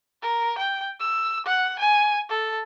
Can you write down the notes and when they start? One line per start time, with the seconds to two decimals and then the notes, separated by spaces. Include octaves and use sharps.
0.23 A#4
0.58 G5
1.00 E6
1.47 F#5
1.79 G#5
2.30 A4